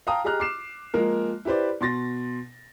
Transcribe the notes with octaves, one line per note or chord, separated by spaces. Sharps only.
F5 G5 A5 A#5 D#6
G4 G#4 D#5 A#5 F6 F#6
D6 C7 E7
F3 G#3 A#3 A#4
E4 G4 B4 C5 D5
B2 C6 A6 A#6